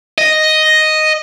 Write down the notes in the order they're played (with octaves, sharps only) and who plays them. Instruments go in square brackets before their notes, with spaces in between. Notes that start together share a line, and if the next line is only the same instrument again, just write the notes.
[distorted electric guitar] D#5